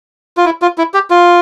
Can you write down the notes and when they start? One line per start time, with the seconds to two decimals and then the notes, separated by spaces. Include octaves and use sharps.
0.37 F4
0.45 E4
0.62 F4
0.78 E4
0.94 G4
1.10 F4